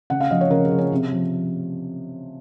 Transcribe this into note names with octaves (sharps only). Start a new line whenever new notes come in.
C#3 F#5
F5
F3 D#5
C#5
C#3 A#4
G#4
F3
C#4
C3
F3